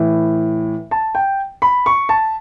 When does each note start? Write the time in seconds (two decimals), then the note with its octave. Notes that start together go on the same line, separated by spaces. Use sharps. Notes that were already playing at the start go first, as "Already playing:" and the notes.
Already playing: A2 E3
0.91 A5
1.15 G5
1.62 B5
1.86 C#6
2.09 A5